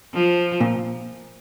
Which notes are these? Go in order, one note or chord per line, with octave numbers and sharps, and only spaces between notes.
F3
A#2